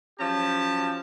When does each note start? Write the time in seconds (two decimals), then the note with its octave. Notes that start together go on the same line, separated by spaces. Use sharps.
0.19 F3 F#3 C#4 G4 A5